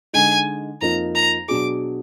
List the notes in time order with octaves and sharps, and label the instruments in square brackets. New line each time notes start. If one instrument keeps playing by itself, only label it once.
[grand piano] D3 G#3 D#4 [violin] G#5
[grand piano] F2 F3 A#3 D#4 [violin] A#5
[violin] A#5
[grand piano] B2 F#3 D4 G#4 [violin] D6